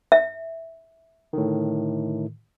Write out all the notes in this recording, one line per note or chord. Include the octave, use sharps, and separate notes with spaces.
E5
A2 D3 D#3